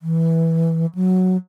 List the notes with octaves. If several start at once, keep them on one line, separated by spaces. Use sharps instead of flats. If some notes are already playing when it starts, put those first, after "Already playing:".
E3
F#3